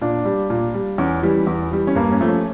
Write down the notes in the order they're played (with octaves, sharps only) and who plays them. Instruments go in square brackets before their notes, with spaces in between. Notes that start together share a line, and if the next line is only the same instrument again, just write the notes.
[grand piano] A#2 D4
G3
A#2
G3
E2 C#4
E3 G3
E2
E3 G3
C#4
G2 A#3
C#4
F3 A3
C#4